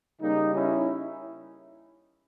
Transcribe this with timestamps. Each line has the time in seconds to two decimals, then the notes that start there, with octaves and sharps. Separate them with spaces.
0.21 C#3 G3 A#3 D#4
0.55 C#4 E4